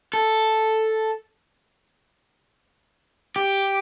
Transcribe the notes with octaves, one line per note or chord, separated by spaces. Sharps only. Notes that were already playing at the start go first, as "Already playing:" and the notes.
A4
G4